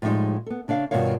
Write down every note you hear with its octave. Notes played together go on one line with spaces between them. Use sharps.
A2 F3 G3 G#3 D#4
B3 A4
C#3 D4 C#5 F5
G2 B2 D#3 F4 C#5 F5